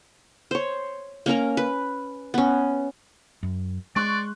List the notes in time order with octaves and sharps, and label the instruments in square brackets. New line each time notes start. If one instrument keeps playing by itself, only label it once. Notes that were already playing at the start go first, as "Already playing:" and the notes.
[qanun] C5 C#5
A#3 C#4 A#4 A#5
B4
B3 C#4
[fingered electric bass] F#2
[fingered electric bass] G#3 [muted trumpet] D5 [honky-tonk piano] C6 C#6 F#6